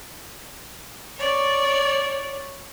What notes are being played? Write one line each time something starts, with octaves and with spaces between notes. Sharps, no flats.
C#5 D5